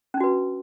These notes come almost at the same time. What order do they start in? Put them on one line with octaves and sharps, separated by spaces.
C#4 D4 F#4 B4